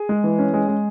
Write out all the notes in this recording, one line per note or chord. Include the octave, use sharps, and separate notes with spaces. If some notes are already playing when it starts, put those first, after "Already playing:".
Already playing: G#4
G#3
E3
C#4
G#3
G#3